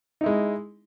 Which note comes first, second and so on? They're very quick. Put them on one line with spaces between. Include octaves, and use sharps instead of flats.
D#4 E4 G#3